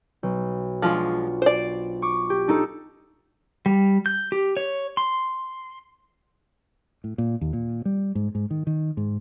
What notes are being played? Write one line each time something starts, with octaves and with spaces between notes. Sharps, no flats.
B1
F3 G#3 D4 F4 F#4
C5 D5
C#6 D6
G4
D4 D#4 A4
G3
G6
G4
C#5
C6
A2
A#2
D#2
A#2
G3
G#2
G#2
D#3
D#3
G#2